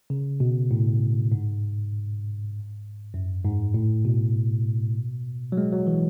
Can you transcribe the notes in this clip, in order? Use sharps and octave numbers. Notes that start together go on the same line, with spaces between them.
C#3
B2
A2
G#2
F#2
G#2
A2
B2
F#3
G#3
F#3
E3